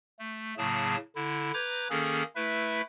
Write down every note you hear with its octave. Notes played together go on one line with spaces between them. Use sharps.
A3
A2 C#3 F#3 A#3 G#4 A5
D3 E4
B4 A#5 D6 G6 G#6
D#3 A#3 C#4 G#4 A4
A3 E4 B4 E5